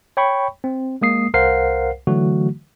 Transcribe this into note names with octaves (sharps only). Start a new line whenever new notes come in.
C#5 G5 B5 C#6
C4
G#3 A#3 D#6 C7
C2 A#4 C5 F5 F#5 C7
D3 E3 F#3 A3 F#4